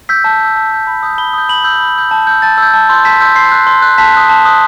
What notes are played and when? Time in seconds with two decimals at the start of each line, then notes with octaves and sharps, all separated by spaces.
0.09 E6 G6 B6
0.24 A5
0.40 E6 G6
0.56 A5
0.71 E6 G6
0.87 B5
1.03 D#6 G6
1.18 B5 G7
1.33 D#6 G6
1.49 B5 F#7
1.64 E6 G6
1.80 B5
1.96 E6 G6
2.11 A5
2.27 E6 G6
2.42 A5 A6
2.58 E6 G6
2.74 A5
2.89 C6 E6 G6
3.05 A5 B6
3.21 C6 E6 G6
3.36 C6 C7
3.52 F#6
3.67 C6
3.82 F#6
3.98 A5 B6
4.14 D#6 F#6
4.29 A5
4.45 D#6 F#6